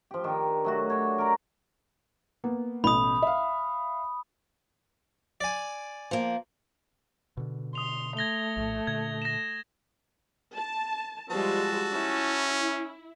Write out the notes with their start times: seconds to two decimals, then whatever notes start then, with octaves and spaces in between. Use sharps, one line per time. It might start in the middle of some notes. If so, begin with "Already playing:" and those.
0.11 F3 G4
0.24 D#3 D4
0.64 F#3 A3 F#4
0.90 D4 C#5
1.18 A#4 D5 A#5
2.44 A#3 B3
2.84 A1 B2 B5 D#6
3.22 E5 F5
5.41 D5 G#5
6.11 F3 A#3
7.37 B2 D3
7.75 C6 D#6 F7
8.17 A3 G#6 A#6 G7
8.57 A#1 A2
8.87 A#2 D3 G#6
9.22 A#6 E7
10.55 A5
11.31 F3 G3 G#3 F#4 A5 E6
11.92 C#4 E4